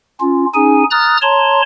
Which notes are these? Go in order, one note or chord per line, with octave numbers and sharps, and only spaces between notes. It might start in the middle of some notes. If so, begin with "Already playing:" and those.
C#4 F4
C#4 D#4 G#4 G#5
A#5 D#6 F6 F#6 A6
C#5 A5 A#5 C6